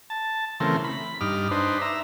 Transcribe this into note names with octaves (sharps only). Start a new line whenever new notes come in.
A5
C#3 E3 A3 C4 A#4
B5
G2 D#4 D6 F6
D4 D#4 B4 C5
E5 A#5